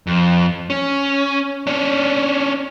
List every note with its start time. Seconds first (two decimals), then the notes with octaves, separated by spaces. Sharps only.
0.07 F2
0.70 C#4
1.67 C#4 D4